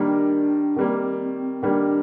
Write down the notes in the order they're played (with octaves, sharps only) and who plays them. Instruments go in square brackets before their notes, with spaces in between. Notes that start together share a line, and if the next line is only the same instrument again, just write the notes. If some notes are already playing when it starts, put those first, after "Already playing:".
Already playing: [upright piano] D#3 G3 A#3 [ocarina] D4
[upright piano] D#3 G3 A#3 [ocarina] C4
[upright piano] D#3 G3 A#3 [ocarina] D4